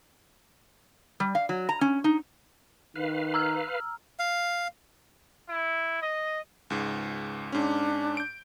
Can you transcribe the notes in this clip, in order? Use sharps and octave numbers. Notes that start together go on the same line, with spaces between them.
G3
F5
F#3
A#5
C#4
D#4
D#3 B4 F5
A#5 E6 F6
F5
E4
D#5
C#2 G#2
G#2 C#4 D4
G6 D7